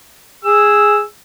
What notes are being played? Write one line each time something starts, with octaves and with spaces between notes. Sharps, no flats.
G#4 E6